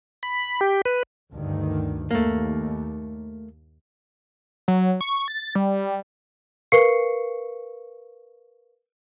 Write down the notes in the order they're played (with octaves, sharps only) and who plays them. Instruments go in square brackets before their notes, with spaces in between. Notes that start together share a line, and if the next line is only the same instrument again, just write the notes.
[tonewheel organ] B5
G4
B4
[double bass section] D2 G2 D#3
[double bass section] D#2 [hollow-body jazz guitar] A3 A#3
[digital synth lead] F#3
C#6
A6
G3
[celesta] A#4 B4 F5 C#6 C7 C#7